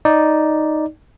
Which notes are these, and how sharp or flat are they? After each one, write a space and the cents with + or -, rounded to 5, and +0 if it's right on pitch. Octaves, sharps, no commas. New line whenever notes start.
D#4 +0 D5 +0